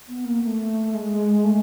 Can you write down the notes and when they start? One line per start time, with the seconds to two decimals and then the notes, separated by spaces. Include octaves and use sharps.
0.09 B3
0.26 A#3
0.44 A3
0.94 G#3
1.45 A3